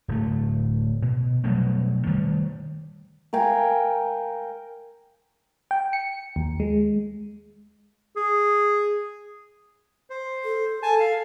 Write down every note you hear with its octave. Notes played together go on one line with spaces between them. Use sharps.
D1 A3
B2
B2 F#3 G3 A3
D#3 G3 A3
A#4 F5 G5 G#5
G5
C#7
D#2
G#3
G#4
C5
A4
A4 G#5 A5
F5